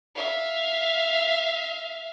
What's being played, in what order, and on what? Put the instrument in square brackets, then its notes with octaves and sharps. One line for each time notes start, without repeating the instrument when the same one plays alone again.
[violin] E5 F5